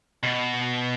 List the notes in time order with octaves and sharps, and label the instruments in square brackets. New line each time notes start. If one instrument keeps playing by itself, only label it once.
[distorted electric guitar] B2